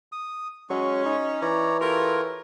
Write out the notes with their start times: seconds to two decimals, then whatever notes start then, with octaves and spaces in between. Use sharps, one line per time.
0.12 D#6
0.70 F#3 G#3 C#4 C#6
1.05 D#4
1.42 E3 C#5 D5 A#5
1.81 F4 G4 A4 A#4 C#5